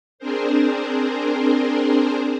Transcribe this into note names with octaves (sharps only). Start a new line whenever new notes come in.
C4 D4 G#4 A#4 C5